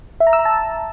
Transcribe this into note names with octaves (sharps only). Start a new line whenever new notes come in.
E5
A#5
E6
A#5
A5